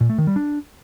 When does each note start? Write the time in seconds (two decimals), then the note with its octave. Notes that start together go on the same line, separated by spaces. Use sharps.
0.01 A#2
0.09 A3
0.18 D#3
0.27 G3
0.36 D4